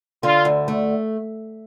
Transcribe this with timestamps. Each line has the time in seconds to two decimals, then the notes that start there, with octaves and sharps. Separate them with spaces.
0.23 D3 F4
0.45 D2
0.68 A3